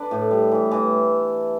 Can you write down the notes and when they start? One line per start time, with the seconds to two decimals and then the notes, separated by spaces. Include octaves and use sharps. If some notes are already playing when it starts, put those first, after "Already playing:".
Already playing: D4 B4 D5
0.11 A2
0.31 G3
0.52 E3
0.71 E3